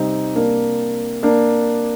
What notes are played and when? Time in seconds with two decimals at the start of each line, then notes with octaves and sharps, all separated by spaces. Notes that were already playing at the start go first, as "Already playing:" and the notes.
Already playing: C3 G3 C4 D#4
0.36 A#3 D4
1.23 A#3 D4